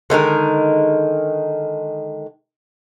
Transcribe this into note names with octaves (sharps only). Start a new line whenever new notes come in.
D3 D#3 G#3 A#4